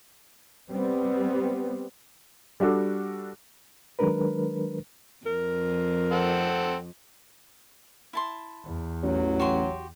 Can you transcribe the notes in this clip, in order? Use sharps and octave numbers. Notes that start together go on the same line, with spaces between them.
G3 B3 C4
G3 D4 F#4 A4
D#3 F#3 G#3 D4 A#4 B4
F2 A#4
C4 A4 F#5
E4 A5 C6
E2
A1 F#3
F#4 G4 C6